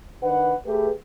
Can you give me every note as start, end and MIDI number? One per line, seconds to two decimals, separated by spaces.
0.23 0.53 51
0.23 0.53 62
0.23 0.53 71
0.23 0.53 78
0.66 0.89 57
0.66 0.89 67
0.66 0.89 68
0.66 0.89 71